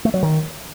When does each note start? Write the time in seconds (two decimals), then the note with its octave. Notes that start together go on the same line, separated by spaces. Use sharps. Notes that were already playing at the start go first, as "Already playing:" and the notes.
0.05 A3
0.14 F#3
0.23 D#3